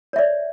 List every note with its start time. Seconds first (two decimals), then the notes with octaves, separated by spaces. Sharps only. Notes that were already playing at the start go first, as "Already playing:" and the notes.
0.13 C#5
0.16 E5
0.19 D5